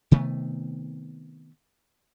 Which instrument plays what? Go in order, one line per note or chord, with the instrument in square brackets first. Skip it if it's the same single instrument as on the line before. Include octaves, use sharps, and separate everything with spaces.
[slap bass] C3 D#3 A3 B3